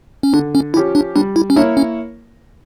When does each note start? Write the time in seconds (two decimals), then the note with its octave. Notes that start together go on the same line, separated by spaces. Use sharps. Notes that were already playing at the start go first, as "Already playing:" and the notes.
0.23 C#4
0.33 D3 D4
0.55 C#4
0.74 F3 C#4 E4 G4
0.95 D4
1.16 G3 D4
1.36 E4
1.50 C#4
1.56 A#3 D4 E4 A#4 C#5
1.77 C#4